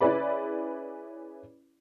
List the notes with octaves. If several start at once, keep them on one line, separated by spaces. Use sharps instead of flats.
C#4 E4 G#4 B4 D5 B5